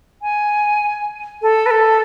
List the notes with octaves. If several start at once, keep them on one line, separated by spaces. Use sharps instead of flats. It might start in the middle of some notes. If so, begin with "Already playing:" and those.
G#5
A4
B4
A4